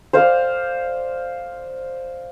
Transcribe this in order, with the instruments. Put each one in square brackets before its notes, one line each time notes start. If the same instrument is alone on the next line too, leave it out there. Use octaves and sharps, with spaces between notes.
[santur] C5 D5 F5